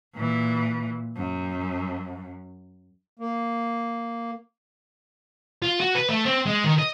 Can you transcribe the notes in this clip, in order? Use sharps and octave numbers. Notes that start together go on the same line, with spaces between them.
A#2 E3
F#2
A#3
F4
F#4
B4
A3
C4
G#3
D#3
D#5